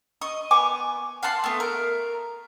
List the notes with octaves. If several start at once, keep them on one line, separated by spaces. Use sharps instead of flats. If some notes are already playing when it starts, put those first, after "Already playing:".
D#5 C#6
B3 G#5 C#6 D6
F5 F#5 A5 C6
A3 B3
A#4